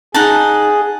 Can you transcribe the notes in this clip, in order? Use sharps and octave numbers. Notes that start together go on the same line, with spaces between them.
D#4 G#4 F#5 A5